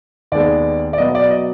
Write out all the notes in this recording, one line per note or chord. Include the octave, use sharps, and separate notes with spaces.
D#2 D#3 G#3 B3 D5
D5
B2 F#3 B3 D#5
D5
D#5